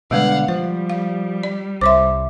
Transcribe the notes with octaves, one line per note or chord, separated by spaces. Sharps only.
B2 D3 G3 G#3 B4 F5 F#5
F3 G3 C5
F5
D5
C2 C5 C#5 E5 C6 D6